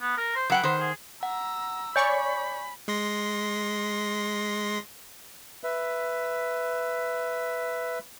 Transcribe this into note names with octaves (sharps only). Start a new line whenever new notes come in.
B3
A#4
C5
F#3 B4 F#5 G5
D#3 C5
G#4
F#5 A#5 E6
C#5 D5 G#5 B5 C#6 G6
G#3 C6 A#6
B4 E5